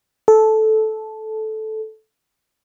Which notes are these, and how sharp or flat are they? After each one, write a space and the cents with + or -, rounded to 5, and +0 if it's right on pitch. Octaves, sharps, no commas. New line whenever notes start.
A4 -10